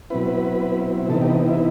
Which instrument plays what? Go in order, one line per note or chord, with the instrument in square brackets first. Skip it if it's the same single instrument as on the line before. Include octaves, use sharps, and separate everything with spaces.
[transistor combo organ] B2 F#3 C4 E4 B4
C3 E3 B3 D#4 A4
G4
E4